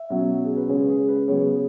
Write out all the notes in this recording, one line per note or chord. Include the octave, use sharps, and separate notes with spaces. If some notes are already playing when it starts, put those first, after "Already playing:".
Already playing: E5
B2 F#3 C#4
G#4
B4
C#3 G#3 C#4 G#4 C#5
G#4
B4
C#3 F#3 B3 G#4 C#5